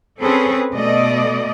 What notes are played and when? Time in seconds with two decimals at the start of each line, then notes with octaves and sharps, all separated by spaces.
0.21 C4 C#4 G#4 A4 B4
0.72 B2 A3 D5 D#5